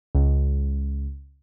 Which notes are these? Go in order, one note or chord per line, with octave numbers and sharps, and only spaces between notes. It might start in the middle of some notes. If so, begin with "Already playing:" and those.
C#2